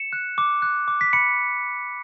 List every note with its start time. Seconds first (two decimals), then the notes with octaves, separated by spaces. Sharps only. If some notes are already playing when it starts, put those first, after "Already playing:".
Already playing: C#7 E7
0.13 F#6
0.38 D6
0.62 F#6
0.88 D6
1.01 B6
1.13 B5 C#7